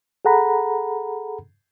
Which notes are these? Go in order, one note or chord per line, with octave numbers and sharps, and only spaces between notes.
G#4 A4 F#5 A#5 B5